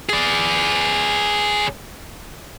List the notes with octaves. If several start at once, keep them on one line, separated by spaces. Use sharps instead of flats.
G#4 D5